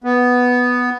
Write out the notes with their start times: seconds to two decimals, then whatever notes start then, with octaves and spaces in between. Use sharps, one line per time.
0.04 B3